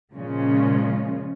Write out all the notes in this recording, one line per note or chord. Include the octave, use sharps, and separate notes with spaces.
A#2 C#3 F3 G#3 C#4